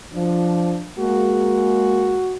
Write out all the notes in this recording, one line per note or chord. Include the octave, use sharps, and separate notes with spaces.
F3 D4
G#3 A#3 F#4